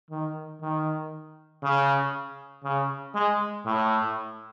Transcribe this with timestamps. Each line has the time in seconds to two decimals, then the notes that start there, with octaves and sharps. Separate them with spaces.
0.11 D#3
0.61 D#3
1.63 C#3
2.64 C#3
3.15 G#3
3.66 A2